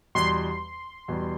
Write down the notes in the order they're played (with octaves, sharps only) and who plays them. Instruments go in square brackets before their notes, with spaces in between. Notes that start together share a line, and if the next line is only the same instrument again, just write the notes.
[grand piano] E2 B2 G3 [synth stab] C6
[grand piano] E2 B2 G3